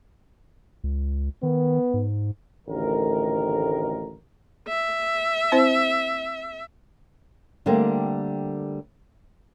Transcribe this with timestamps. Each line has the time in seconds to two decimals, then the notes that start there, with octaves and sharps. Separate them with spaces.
0.84 C#2
1.43 D#3 B3
1.94 G#2
2.68 A1 D2 G#2 D#3 A#4
4.68 E5
5.52 C4 E4 C5
7.66 D3 G3 A3 A#3 C4